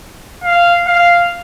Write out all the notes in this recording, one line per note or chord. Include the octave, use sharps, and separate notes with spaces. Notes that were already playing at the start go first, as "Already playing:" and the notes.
F5
F5